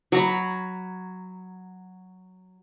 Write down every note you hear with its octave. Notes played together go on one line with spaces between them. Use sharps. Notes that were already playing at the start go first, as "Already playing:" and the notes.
F#3 A#5 B5